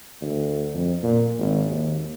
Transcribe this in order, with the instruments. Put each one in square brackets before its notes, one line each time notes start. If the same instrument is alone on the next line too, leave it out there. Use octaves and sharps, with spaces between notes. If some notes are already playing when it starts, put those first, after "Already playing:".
[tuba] D2
F2
A#2
G#1
D#2